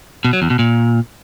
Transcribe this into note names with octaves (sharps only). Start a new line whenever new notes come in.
B2
F#3
E2
B2
A#2